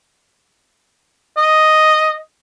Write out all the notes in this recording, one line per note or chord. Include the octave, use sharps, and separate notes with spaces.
D#5